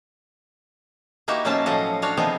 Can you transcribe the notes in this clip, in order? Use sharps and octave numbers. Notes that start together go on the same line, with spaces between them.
A#3 D#4 E4 F#4 G4 E5
B2 F#3 A#3 C#4 C5 A5
A2 F3 F#3 A4 D#5 F#5
D4 F#4 C#5 F5
C3 F3 B3 C4 D#4 G#4